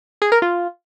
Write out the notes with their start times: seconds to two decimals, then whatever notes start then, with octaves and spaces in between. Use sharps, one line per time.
0.22 G#4
0.32 A#4
0.42 F4